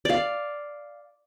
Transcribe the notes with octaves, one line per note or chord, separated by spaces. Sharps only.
D5 F5